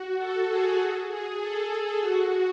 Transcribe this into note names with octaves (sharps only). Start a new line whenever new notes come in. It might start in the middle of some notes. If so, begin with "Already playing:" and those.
Already playing: F#4
A4
G#4
F#4
G#4
A4
G#4
F#4